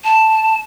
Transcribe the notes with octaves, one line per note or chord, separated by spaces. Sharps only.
A5